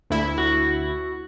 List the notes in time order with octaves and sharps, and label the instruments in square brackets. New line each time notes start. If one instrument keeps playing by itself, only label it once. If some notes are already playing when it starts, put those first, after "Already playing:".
[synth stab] D2 E4
[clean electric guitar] F#4